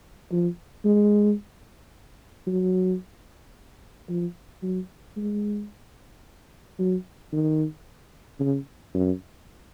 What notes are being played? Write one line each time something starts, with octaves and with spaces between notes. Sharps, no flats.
F3
G#3
F#3
F3
F#3
G#3
F#3
D#3
C#3
F#2